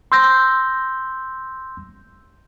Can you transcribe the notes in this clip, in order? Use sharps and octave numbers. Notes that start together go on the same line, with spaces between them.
C6 E6 G6 A#6